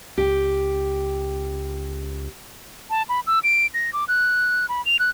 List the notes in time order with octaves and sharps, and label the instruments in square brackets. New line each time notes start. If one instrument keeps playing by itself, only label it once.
[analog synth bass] C#2 [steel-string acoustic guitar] G4
[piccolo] A5
B5
E6
D7
A#6
D6
F#6
B5
F7
F#6